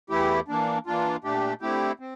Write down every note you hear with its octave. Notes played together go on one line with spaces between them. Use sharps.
E2 E3 A3 E4 G4
E3 A#3 D4
E3 A#3 D4 F4
A#2 A3 D4 G4
D3 A3 C4 E4 G4
C4